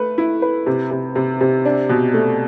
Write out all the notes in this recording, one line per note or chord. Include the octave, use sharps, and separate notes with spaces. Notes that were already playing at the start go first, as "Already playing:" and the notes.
Already playing: A3 B4
E4
B4
C3
C3
C3
C3
D4
B2
A3